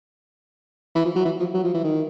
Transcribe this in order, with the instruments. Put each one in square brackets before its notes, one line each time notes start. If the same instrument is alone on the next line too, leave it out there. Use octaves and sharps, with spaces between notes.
[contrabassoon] E3
F3
F#3
E3
F3
F#3
F3
E3
D#3